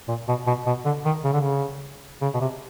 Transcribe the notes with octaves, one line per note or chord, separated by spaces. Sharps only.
A#2
B2
B2
B2
D3
D#3
C#3
D3
C#3
C#3
B2
C3